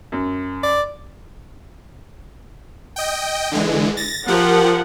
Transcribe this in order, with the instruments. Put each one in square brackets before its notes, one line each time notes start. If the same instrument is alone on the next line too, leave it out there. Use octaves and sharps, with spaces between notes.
[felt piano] F#2
[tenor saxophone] D5
[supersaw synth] D#5 G5
D3 E3 G#3
A6 A#6
[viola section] F3 A#4 F#5 [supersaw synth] G4